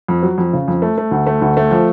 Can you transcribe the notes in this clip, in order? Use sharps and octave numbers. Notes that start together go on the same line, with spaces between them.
F2
F#3
F2
C#3
F2
A3
A3
D2
A3
D2
A3
F3